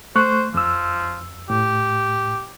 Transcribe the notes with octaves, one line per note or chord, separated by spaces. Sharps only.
A3 C5 C#6 F#6
F2 F3 E6
A2 G4